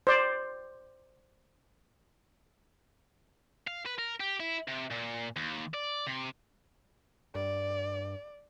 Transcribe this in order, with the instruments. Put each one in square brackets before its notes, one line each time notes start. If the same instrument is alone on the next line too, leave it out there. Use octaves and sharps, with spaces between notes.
[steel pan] C5 D5
[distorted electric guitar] F5
B4
A#4
G4
E4
C3
A#2
D#2
D5
C3
[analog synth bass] G2 [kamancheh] D5